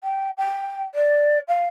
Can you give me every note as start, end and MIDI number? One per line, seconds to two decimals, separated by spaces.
0.03 0.29 79
0.37 0.81 79
0.94 1.38 74
1.48 1.67 77